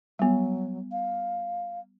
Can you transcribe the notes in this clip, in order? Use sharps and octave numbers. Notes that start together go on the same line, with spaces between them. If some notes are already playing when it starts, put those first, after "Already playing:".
F#3 G3 B3
F5